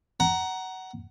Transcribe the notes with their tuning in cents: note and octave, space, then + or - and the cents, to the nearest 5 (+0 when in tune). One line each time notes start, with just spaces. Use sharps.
F#5 +20 A#5 +5